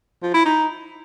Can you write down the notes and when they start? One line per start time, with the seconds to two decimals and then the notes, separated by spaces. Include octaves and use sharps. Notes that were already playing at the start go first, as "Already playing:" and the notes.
0.23 F3
0.34 E4
0.45 D#4